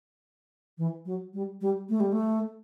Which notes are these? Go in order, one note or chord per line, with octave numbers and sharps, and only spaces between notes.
E3
F#3
G3
G3
A3
G3
A3